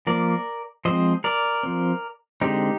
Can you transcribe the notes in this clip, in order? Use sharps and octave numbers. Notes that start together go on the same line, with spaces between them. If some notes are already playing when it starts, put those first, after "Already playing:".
F3 A#3 A#4 D5
F3 G#3 C4 C5 D#5
A#4 D5
F3 C4
D3 G#3 C4 D#4 G4